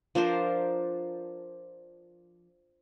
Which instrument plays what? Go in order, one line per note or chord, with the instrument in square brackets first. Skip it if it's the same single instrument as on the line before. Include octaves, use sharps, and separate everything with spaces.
[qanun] F3 D4 A#4 C5